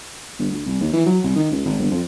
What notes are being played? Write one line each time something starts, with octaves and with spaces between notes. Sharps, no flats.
G1
D2
C2
D#2
E3
F#3
C2
D#3
C#2
G#1
G1
F2